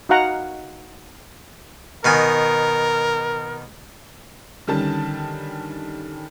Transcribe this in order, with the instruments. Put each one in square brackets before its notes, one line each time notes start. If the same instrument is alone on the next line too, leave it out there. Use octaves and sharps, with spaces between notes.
[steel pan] D#4 F#4 F5 F#5 A#5
[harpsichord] B2 D#3 G#5 [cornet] A#4
[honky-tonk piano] D3 D#3 G3 C#4 A5